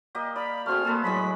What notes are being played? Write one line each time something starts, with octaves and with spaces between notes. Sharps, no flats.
A#3 G4 D#5
D5 F5 B5
A3 C4 F#4 G#4 F6
A#3 G#4 A4 B4
A2 F#3 G#3 B5 B6